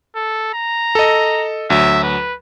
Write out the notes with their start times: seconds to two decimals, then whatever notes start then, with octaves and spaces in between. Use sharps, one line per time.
0.16 A4
0.54 A#5
0.95 A4 D#5
1.70 D2 F#3 E5
2.03 B4